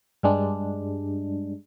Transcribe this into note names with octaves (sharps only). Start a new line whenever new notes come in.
G2 G3 G#3 D4